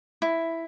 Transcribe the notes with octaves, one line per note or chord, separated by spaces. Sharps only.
E4